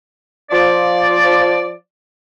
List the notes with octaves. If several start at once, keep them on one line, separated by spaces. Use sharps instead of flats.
F3 D5